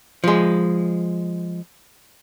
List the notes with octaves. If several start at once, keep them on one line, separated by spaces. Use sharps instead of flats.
F3 G#3